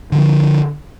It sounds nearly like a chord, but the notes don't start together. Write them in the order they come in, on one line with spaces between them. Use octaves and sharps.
D3 E3 F3